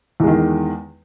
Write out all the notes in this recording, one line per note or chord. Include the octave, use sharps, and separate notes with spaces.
E2 D#3 G#3